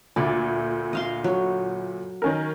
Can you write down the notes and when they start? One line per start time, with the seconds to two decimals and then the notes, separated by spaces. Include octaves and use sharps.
0.16 D2 A#2 D5
0.93 D#5 F5 C6
1.24 F#3
2.22 D#3 C#4 A#4